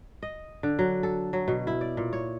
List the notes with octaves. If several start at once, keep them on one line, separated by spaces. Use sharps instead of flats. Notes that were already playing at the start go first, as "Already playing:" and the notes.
D#5
D3
F#3
A4
F#3
B2
E4
D5
A#2
C#5